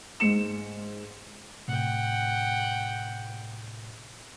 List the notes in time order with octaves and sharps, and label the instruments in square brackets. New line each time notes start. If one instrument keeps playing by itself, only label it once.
[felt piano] G#2 C#7 E7
[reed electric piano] A2 C3 [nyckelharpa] F#5 G5